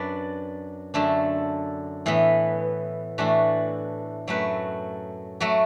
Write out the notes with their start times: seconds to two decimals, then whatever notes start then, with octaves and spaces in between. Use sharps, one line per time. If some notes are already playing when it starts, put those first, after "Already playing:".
Already playing: F#2 F#3 D4 B4 D5
0.94 F#2 D3 A3 D4 A4
2.06 A2 E3 B3
3.18 A2 E3 A3 D4 F#4
4.28 F#2 F#3 A3 F#4 B4
5.40 F#3 A3 F#4